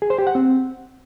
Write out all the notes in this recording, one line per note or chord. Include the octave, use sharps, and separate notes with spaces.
G#4
C5
G4
F#5
C4